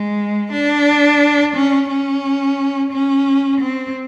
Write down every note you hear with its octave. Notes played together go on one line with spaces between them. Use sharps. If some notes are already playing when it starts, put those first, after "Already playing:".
Already playing: G#3
D4
C#4
C#4
C#4
C4